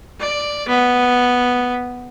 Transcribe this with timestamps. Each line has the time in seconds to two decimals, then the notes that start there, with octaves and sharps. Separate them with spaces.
0.20 D5
0.68 B3